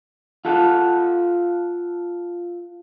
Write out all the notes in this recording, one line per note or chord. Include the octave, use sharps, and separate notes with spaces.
F4 A4 F#5